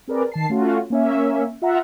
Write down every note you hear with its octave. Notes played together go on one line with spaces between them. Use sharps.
C4 G#4 A#4 B4 D5
D#3 A5 C7
A3 C#4 F4 F#4
A#3 C#4 E5
F4 E5 F#5 A#5